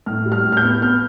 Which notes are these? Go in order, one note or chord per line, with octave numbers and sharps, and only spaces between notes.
A2 F6
G3
F6
A2
F6
G6
B3
B3 F6